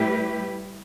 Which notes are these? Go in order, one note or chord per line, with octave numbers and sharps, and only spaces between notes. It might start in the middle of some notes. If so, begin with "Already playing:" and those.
Already playing: A2 G3 E4 G4 B4